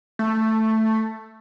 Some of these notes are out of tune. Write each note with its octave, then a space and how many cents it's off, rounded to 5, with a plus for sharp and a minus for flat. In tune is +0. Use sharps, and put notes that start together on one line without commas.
A3 +5